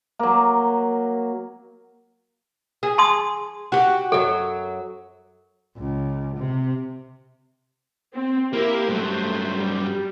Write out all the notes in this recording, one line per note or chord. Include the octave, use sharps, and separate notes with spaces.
F#3 A#3
G#4
A5 C6 D#6
F#4 G4
F#2 F#3 A4
C#2
C3
C4
A#3 E4 G4 A#4
G2 F#3 A3 C5
G3